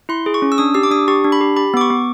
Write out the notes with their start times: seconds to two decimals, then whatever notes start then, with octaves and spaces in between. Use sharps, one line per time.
0.09 E4 C6
0.26 G#4
0.34 C#6
0.42 C#4
0.52 E6
0.58 D4 D#6
0.74 G4 E6
0.83 D6
0.91 D4 D#6
1.08 G4 C#6
1.24 D4
1.32 B5
1.41 G4
1.57 G4 B5
1.74 B3 D6
1.81 C#6
1.90 B3